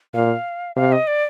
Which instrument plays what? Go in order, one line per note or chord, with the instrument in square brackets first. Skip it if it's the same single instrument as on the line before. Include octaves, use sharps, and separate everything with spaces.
[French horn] A#2 [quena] F5
[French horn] C3 [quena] F5
[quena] D#5
D5